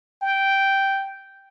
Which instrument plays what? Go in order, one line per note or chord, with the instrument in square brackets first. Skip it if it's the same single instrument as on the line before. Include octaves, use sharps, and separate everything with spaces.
[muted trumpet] G5